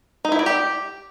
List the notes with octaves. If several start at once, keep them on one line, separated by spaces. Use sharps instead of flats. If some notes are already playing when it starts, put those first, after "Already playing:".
D#4
E4
D5
G4